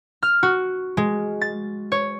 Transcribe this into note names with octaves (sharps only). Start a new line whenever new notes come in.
F6
F#4
G#3
A6
C#5